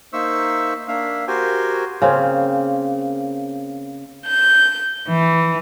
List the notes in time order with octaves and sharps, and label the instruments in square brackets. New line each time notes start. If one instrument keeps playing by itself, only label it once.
[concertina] A#3 D#4 C5 E5 C#6 E6
A#3 D4 E5 F5
F#4 G4 A#4 C5 G5 G#5
[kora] C#3 A#3 C4
[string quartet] G6
E3